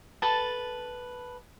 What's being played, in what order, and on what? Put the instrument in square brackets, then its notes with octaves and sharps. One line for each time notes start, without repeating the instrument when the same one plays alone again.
[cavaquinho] A4 B4 A5